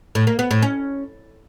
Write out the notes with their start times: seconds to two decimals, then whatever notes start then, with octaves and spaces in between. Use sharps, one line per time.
0.15 A2
0.27 A#3
0.39 B3
0.51 A2
0.62 C#4